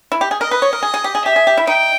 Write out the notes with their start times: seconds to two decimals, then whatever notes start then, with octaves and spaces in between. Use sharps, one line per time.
0.12 E4
0.21 G4
0.31 G#4
0.41 A#4 D#5
0.51 B4
0.62 C#5
0.73 A#4
0.83 G#4
0.94 G#4
1.04 G4
1.15 G#4
1.25 G4 E5
1.36 G#4
1.47 G4
1.57 E4
1.67 D#4 G5